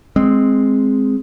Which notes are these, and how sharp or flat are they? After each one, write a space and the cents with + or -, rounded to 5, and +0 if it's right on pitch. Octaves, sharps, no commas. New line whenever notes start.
G#3 +0 C4 +0